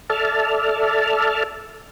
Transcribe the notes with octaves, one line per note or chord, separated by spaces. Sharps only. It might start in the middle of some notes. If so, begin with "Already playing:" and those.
A4 D5 E5 A5 F6